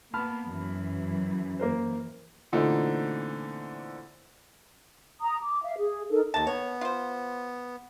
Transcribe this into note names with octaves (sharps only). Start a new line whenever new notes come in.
A#3 B3 A5 B5 F6
F#2 E3
A#3 A#4 C5
A#2 D3 E3 A3 C4 D#4
A#5 D#6
D6
E5 F5
G#4
D#4 A4 A#4
D#2 D#3 A5
B3 C#5
F4 C5